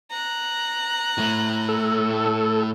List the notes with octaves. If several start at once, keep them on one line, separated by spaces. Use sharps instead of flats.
A#5 F#6
A2 A3
A4